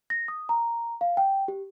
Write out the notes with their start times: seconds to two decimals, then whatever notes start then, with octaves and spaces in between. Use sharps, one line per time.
0.10 A#6
0.28 D#6
0.49 A#5
1.01 F5
1.17 G5
1.48 G4